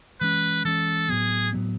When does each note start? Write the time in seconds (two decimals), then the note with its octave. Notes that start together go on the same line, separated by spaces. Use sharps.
0.21 E3 G#3 C#4 B4
0.65 E3 G#3 C#4 A4
1.09 A2 F#3 B3 G#4
1.53 A2 F#3 B3